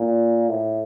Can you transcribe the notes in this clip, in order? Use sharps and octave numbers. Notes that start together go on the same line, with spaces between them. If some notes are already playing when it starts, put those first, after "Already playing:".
Already playing: A#2
A2